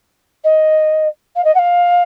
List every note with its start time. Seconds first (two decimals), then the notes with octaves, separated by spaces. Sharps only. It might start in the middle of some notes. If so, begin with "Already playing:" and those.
0.44 D#5
1.36 F5
1.44 D#5
1.55 F#5
1.59 F5